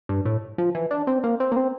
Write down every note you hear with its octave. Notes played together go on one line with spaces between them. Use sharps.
G2
A2
F3
E3
D4
C4
A#3
C4
A#3
C4